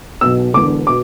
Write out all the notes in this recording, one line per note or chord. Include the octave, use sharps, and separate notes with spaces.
B1 B2 E6
E1 E2 D3 D6
B2 D6